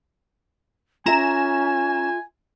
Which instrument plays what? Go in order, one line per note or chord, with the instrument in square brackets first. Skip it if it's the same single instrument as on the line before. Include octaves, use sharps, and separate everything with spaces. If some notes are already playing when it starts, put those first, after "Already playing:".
[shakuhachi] C#4 [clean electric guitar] F4 A4 E5 [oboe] G#5 [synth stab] A#5 E7